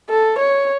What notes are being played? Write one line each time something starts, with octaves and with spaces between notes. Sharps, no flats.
A4
C#5